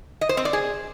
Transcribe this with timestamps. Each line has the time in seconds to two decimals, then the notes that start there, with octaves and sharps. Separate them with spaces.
0.21 D#5
0.29 C5
0.37 C4
0.45 D5
0.53 G#4